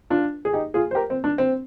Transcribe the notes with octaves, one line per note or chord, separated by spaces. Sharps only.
D4 F4
G#4
D#4 G4
F4 G#4
C5
G4 A#4
C4
D4
C4